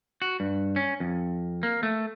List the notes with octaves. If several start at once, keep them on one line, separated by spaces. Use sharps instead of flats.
F#4
G2
C#4
F2
A#3
A3